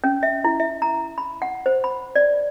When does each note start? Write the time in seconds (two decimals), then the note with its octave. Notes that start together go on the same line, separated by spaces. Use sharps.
0.04 C#4
0.23 E5
0.44 E4
0.60 E5
0.82 A#5
1.18 B5
1.42 F#5
1.66 C5
1.84 B5
2.15 D5